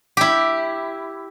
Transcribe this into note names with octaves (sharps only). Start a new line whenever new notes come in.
E4 G4